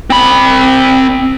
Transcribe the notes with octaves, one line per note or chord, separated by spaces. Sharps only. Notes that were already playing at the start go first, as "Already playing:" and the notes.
C4 B5